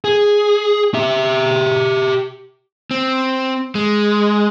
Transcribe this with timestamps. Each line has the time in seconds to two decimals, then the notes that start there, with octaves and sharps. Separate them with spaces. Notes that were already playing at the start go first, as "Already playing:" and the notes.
0.05 G#4
0.94 G4 E5
2.91 C4
3.75 G#3